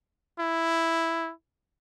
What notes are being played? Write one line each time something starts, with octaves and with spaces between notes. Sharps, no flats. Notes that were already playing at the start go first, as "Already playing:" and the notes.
E4